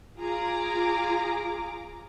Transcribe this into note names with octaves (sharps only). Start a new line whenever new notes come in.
F4 G#4 A#5 D6